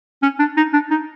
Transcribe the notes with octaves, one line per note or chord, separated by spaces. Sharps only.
C#4
D4
D#4
D4
D#4